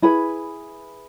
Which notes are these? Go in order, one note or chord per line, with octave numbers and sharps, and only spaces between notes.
E4 G#4 B4 B5